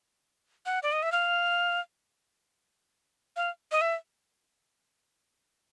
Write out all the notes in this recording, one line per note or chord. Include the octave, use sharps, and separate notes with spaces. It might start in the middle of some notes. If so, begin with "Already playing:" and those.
F#5
D5
D#5
E5
F5
F5
D#5
E5